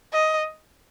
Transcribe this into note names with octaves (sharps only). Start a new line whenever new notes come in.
D#5